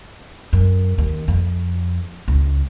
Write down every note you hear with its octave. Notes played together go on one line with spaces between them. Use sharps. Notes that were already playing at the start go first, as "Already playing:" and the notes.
F#2
D#2
F2
C#2